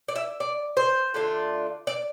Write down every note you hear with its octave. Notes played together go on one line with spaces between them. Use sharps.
D5
E5
D5
C5
D3 A3 D4 F4
D5